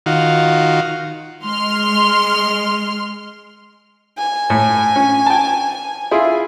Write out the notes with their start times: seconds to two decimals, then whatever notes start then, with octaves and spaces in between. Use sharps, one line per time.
0.06 D#3 F4 F#4
1.44 G#3 C6 F6
4.18 G#5
4.50 A2
4.96 C#4
5.26 G5 A5
6.11 E4 F4 G#4